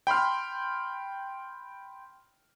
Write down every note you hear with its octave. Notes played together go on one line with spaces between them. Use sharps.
G5 B5 C6 F6